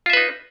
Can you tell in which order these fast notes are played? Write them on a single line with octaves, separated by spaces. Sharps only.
F4 E5 B4 D#4